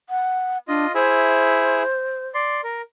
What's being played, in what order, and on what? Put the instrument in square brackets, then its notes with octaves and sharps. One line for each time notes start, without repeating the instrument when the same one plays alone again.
[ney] F#5
[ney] D4 [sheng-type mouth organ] F4 D#5
[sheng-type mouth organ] E4 G#4 E5 [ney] C5
[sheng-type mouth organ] D5 C6
A#4